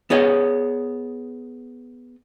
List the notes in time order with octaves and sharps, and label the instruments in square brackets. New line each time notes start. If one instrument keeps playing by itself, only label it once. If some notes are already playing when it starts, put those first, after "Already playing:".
[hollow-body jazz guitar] B3 G#4 C#5 D#5